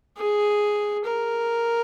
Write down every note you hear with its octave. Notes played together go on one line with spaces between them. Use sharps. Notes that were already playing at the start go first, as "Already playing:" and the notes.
G#4
A#4